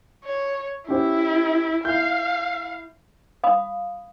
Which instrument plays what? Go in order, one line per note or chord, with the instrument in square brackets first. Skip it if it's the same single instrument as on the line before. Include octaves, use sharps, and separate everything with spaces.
[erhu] C#5
[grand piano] C#4 G4 C5 [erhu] E4
[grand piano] E4 G6 [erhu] F5
[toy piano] F5 B5 D#6